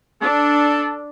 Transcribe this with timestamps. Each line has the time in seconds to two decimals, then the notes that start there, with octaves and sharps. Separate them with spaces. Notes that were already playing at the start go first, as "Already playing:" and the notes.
0.22 D4 A4